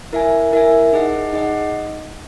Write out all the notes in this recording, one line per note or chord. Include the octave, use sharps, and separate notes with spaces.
E4 A#4 E5 G#5
E4 A#4 E5 G#5
D#4 G#4 D#5 F#5
D#4 G#4 D#5 F#5